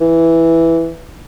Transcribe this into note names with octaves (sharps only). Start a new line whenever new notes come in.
E3